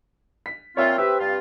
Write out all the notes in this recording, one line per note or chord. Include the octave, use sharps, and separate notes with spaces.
B6
A#2 C4 F4 C#5 E5
C4 G4 B4 E5
G2 C4 F4